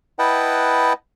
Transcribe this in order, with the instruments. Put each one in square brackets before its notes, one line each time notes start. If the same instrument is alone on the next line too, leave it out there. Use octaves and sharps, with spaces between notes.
[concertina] E4 B4 D#5 F#5 G5 A5